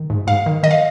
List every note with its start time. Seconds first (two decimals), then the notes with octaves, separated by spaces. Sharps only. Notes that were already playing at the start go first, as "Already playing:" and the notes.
Already playing: D#3
0.10 G#2
0.27 G#2 F5
0.46 D#3
0.63 D#3 D#5
0.71 F5